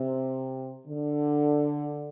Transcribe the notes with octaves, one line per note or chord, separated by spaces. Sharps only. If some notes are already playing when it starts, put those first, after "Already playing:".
Already playing: C3
D3